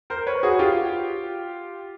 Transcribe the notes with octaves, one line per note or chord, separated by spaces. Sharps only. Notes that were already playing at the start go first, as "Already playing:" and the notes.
A#4 C5
B4 C#5
F#4 G#4
F4 G4